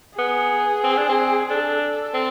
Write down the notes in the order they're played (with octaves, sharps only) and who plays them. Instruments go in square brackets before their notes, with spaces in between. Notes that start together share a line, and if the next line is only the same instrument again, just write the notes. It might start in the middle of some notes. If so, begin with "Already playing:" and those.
[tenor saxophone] B3 [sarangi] G#4
[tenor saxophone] C4
D4
C4
[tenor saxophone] D4 [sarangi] A4
[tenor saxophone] C4